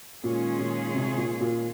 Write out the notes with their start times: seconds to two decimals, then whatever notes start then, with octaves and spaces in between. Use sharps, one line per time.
0.24 A#2 D#3 G#3 C#4 F4 G#4
0.59 A#2
0.94 C3
1.17 A#2
1.41 A#2